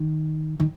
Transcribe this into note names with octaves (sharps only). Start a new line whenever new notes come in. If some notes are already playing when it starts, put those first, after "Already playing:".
Already playing: D#3
D#3